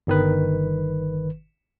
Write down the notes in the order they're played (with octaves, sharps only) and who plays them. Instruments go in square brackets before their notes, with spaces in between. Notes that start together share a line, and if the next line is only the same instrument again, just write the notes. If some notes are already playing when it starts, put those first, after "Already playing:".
[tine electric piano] G1 D#3 B4